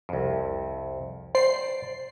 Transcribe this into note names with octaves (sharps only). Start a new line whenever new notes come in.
C2 F2
C5 D5 C7